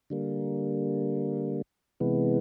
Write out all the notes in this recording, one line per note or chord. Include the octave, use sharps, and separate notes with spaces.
D3 G3 A#3
C3 E3 G#3 B3